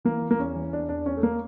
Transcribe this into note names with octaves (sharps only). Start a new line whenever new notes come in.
E3 A#3
E3
A#3
E2 C#4
E3
E2 D4
E2 D4
E2 C#4
A3
A#3